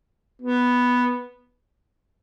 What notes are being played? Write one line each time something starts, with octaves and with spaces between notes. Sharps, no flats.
B3